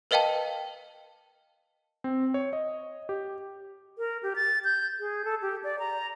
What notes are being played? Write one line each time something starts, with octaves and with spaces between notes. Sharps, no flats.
A#4 B4 D#5 F5 G5 A5
C4
C#5
D#5
G4
A#4
G4
A6
G6
G#4
A4
G4
D5
A#5